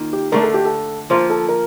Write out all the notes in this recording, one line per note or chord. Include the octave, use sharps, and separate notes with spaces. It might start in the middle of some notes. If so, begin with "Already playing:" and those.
Already playing: D#3 A#3 F4
G4
D3 A3 D4 A#4
A4
G4
A4
F3 A#3 F4 C5
A4
A#4